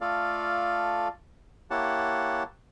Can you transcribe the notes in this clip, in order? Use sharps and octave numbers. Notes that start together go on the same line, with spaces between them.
A3 F4 A4 D5 F5
A#3 E4 G4 C#5 F#5 A5